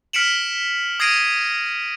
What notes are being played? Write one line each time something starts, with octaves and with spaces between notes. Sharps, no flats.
F6 B6 C#7 D7 E7 F#7
D#6 G#6 A#6 C7 D7 D#7